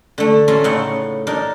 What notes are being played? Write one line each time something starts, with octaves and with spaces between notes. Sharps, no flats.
D3 A3
C#4 F4 E5 A5 A#5
A2 C#3 A3 D#4 E4 F#5
D4 D#4 A#4